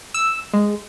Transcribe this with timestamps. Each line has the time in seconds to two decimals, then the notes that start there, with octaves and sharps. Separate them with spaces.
0.14 E6
0.54 G#3